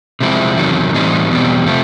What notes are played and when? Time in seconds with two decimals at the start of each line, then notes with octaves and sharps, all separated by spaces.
0.20 C3 F3 G#3 C4 E4
0.58 E2 C3 D#3 F#3
0.94 A2 E3 G3 C4 D#4
1.31 E2 B2 G3 C4
1.66 C3 F3 A3 C4